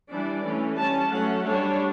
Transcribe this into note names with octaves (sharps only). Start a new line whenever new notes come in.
E3 G3 D4 D5
E3 A3 C#4
G3 C#4 A5
F#3 A3 C#4 F#5
G3 D4 C#5